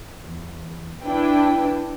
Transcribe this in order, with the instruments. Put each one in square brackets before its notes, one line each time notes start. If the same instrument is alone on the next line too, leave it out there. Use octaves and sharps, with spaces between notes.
[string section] E2
D4 E4 B4 G5